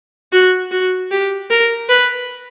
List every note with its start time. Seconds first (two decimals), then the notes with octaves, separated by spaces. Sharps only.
0.32 F#4
0.71 F#4
1.11 G4
1.50 A#4
1.89 B4